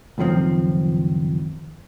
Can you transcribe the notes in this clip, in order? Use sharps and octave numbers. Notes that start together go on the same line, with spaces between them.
C#2 F#2 D#3 F3 C4